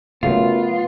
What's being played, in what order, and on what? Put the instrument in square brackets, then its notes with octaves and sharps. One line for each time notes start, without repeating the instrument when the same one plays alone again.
[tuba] F#2 [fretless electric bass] C#3 A3 [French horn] B3 [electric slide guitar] F4